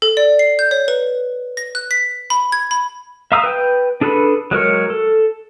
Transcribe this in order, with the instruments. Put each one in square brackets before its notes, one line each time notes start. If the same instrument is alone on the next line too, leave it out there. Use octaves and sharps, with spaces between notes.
[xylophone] A4
D5
C7
G6
C#5
B4
A#6
F#6
B6
B5
G#6
B5
[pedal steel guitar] E5 F5 A#5 D#6 E6
B4 G5
D4 G#4 A4 B4 B5
F#3 G#3 A#4 C#5
A4